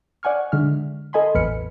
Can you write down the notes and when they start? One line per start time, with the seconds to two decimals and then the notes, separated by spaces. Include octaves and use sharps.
0.23 D5 F#5 G#5 C#6 F6
0.52 D3 G#3 E5 F6
1.13 A4 D#5 G#5 B5 C6
1.35 A1 E2 B4 F6 C#7